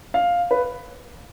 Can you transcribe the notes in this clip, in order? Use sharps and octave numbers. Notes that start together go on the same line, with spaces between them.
F5
B4